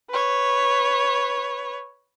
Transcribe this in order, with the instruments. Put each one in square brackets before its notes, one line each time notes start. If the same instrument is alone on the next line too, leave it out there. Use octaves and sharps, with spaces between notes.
[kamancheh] B4 C#5